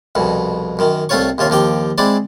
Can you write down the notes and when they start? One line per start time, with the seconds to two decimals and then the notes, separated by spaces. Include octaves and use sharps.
0.15 C2 F2 B2
0.79 F#2 D#3
1.09 C2 A3 C4 F4 C#5 C#6
1.38 D#2 C3 F4 C#5
1.50 D#2 F3 G4 G5
1.98 G#3 C4 E4 D5